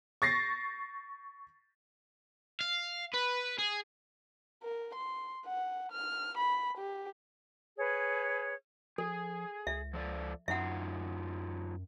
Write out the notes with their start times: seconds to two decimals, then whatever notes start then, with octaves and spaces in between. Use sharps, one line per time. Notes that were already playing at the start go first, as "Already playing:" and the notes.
0.22 C#6 A6 A#6 C7
2.61 F5
3.14 B4
3.59 G#4
4.63 A#4
4.95 C6
5.46 F#5
5.92 F6
6.38 B5
6.78 G4
7.78 G#4 B4 C#5
8.98 F3 G#4 A4
9.67 C#2 E5
9.94 F3 A4 D5
10.48 F#2 F#3 D#4 F4 E5 F#5